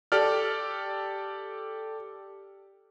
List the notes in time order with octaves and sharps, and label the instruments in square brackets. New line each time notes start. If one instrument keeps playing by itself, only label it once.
[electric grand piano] G4 A4 D5 F6